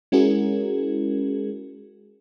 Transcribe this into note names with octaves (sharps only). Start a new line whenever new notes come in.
G#3 C#4 E4 F#4 G#4 A#4